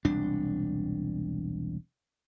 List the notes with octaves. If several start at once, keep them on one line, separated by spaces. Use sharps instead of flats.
E1 C2 D4